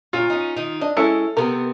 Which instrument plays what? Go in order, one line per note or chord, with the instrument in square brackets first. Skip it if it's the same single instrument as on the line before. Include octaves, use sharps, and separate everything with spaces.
[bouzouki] A#2 C#5 [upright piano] F4
[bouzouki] C#4 D#4
D#3 D#4
[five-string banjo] D4 [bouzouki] D#5
[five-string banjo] G#3 C#4 E4 [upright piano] A4
[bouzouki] C3 B3 C4 [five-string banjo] A#4